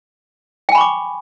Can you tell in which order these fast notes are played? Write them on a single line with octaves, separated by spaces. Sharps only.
G5 G#5 B5 C#6 D6